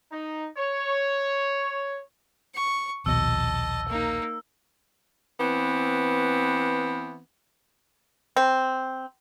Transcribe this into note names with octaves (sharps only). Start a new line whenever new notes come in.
D#4
C#5
C#6
A#1 D#2 B2 D#5 A5 E6
A#3 D#4
E3 B3 C4
C4